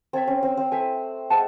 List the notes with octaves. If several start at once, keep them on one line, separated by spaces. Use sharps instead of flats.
C4 A4 C#5 E5
C#4
C4
C4
A3 E4 C5 E5 G#5
G#3 A4 C5 F#5 A5